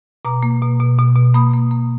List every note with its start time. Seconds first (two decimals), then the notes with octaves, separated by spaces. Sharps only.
0.25 B2 A#5 D6
0.43 A#3
0.62 B2
0.80 B2
0.98 B2
1.16 B2
1.34 A#3 B5 D#6
1.53 A#3
1.71 A#3